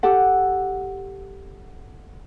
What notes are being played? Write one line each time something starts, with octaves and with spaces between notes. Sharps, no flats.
G4 A4 F#5